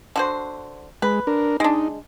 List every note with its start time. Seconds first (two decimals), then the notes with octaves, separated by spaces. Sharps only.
0.16 D3 F#4 C5
1.02 G#3 B4
1.27 D4 A#4
1.60 G#3 D4 D#4